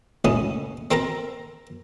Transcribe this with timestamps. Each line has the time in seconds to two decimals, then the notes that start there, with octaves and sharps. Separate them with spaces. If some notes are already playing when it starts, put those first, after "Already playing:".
0.25 C#2 A2 C#4 D#6
0.91 C4 A4 A#4 A5 A#5